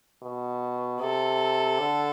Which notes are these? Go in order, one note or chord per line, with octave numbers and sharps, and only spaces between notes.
B2
C3 A4
D3